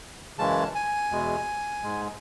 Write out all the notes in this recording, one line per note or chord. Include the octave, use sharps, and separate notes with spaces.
F#2 C#3 E3 G#3 A5
G#5
E2 B2 G#3
G#2 G#3